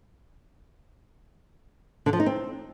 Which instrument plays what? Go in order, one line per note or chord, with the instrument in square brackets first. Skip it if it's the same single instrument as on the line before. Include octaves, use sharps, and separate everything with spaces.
[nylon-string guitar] D3
F3
D#4
C4